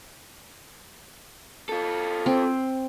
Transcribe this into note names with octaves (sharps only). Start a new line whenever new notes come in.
F4 A4
C4